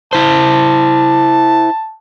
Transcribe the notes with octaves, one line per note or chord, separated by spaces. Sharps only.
E4 C5 A5